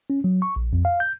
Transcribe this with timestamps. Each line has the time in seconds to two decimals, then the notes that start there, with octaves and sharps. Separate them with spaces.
0.10 C#4
0.24 F#3
0.42 C#6
0.56 A#1
0.73 F2
0.85 F5
1.00 G6